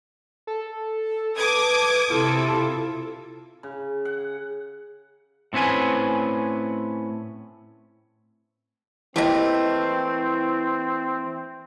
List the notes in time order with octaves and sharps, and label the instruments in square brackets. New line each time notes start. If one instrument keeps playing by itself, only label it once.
[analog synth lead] A4
[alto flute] B4 [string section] D6 D#6 G#6
[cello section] C3 A4 [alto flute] E4 [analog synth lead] F4
[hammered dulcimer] C#3
F#5
[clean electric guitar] A2 C4 C#4 B4 G#5
[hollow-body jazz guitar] E3 A#3 [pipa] A3 G4 D#5 [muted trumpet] C4